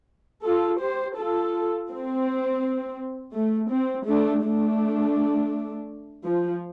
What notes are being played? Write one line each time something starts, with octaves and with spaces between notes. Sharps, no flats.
F4 A4
G4 C5
F4 A4
C4
A3
C4
A3 D4
A3 D4
F3